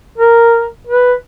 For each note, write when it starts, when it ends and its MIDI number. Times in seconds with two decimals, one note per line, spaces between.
0.18 0.67 70
0.87 1.13 71